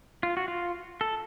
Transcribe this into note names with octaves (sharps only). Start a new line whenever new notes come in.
F4
F#4
F4
A4